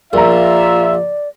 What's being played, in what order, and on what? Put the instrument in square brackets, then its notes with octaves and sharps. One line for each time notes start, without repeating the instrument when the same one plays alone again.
[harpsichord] A#1 [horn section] F4 E5 [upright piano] A#4 A#5 [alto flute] D5